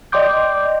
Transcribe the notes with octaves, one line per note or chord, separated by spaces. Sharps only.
D5 D#5 G5 C6 D6 G6